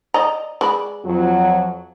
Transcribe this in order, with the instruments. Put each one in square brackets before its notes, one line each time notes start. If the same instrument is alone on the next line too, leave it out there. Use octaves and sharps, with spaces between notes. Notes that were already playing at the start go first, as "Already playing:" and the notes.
[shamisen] D5 D#5 A#5
G#3 D5 B5
[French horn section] F2 F#3